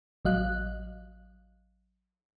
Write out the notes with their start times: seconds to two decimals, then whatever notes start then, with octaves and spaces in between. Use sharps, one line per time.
0.25 A1 F#3 D#5 F5 F#6